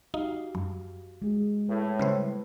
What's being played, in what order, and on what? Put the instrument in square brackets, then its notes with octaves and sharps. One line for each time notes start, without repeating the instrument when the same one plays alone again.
[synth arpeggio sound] D#4 [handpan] F#4 G4 F5
[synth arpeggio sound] F#2
[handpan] G#3 G#4
[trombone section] A2 [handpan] B4
[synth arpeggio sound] C#3 G3 C5 [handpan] B4